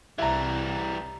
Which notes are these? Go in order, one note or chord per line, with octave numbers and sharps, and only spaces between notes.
C2 E3 G3 E5 A#5